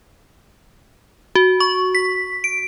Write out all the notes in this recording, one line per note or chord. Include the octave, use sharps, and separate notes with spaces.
F#4
C#6
B6
D7